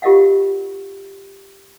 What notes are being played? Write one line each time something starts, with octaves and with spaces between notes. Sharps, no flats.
F4 G4 A#4 D#5 F5 F#5